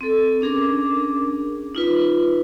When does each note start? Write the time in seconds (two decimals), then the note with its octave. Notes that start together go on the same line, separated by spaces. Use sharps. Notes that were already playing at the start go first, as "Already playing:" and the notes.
0.01 C4 A4
0.41 C#4 D4 G#4 A#4 D6
1.75 D#4 F4 B4